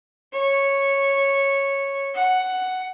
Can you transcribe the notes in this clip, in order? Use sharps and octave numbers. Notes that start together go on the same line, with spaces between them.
C#5
F#5